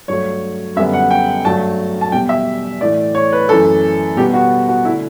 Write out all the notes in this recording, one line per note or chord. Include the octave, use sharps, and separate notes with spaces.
G2 F#3 A3 C#5
F#2 D3 G3 B3 E5
F#5
G5
G2 F#3 A3 A5
A5
E2 B2 G3 G5
E5
A2 E3 A3 D5
C#5
B4
F#2 E3 A3 A4
B2 G3 B3 G4
F#4
F#4
D3 A3 E4